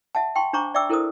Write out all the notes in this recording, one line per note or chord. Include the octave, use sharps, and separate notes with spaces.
E5 F#5 A5
G5 A5 C6 C#6
D4 C5 A#5 C#6 D6
D5 E5 G5 D6 E6
E4 A4 A#4 C5 D#6